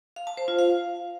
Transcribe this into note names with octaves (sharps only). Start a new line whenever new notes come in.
F5
A5
C5
F4
F5